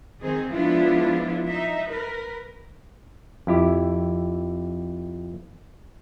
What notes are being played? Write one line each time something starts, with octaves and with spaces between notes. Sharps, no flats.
D#3 C4 G#4
F3 G#3 B3 D4 E4 F4
D#4 E5
A#4 B4
F2 E4 G4